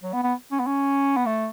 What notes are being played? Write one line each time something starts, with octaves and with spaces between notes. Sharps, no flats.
F#3
B3
B3
C#4
B3
C#4
B3
A3